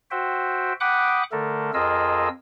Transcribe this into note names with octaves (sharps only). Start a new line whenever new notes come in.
F#4 C5 E5 G5
F#5 G5 B5 D6 D#6 F#6
D3 A3 A4 A#4
F2 F4 G#4 A#4 D#5 E6